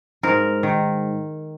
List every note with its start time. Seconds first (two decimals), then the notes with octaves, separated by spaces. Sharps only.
0.23 G#2 A#4
0.63 D#3